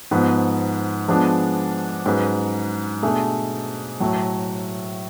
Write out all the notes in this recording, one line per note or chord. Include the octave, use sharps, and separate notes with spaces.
G#2 F3 B3
F3 G#3 B3 D4
G#2 F#3 C#4 G#4 B4
B2 A3 D4 G#4
A2 F#3 A3